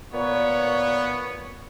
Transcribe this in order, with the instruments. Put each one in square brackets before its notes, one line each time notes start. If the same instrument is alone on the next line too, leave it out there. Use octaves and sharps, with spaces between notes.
[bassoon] A#2 [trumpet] B3 [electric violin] C#5